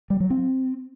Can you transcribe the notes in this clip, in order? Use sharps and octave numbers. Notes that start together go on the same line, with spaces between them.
G3
F#3
C4